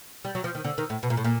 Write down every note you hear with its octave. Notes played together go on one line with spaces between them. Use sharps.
G3
F#3
F3
D#3
D3
D#3
A2
B2
A#2
A2
A#2